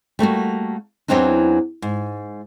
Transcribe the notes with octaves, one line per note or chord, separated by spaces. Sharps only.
G3 A3 A#3 F#4
E2 A#2 F#3 C4 D4 D#4
G#2